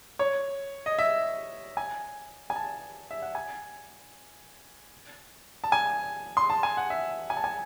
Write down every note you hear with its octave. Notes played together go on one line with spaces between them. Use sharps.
C#5
D#5
E5
G#5
G#5
A5
E5
F#5
G#5
A5
G#5
C6
A5
G#5
F#5
E5
G#5
A5
G#5